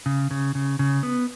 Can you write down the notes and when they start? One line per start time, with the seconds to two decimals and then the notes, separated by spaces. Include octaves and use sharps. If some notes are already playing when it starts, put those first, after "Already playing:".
0.06 C#3
0.31 C#3
0.55 C#3
0.79 C#3
1.03 B3